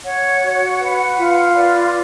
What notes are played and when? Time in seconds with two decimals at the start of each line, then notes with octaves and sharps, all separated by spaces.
0.04 C#5 F#5
0.42 F#4
0.79 B4
1.17 F4
1.54 B4 D5